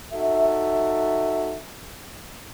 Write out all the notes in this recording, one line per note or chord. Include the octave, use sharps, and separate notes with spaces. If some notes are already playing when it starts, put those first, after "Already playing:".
D#4 F#4 A4 E5